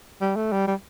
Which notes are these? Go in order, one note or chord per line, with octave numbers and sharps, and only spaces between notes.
G3
A3
G3
G3